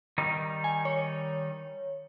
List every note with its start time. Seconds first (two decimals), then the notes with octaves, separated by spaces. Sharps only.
0.18 D#3 G3 D#4
0.64 G#5
0.85 C#5